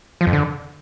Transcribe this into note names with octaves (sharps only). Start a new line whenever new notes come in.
F3
F2
D3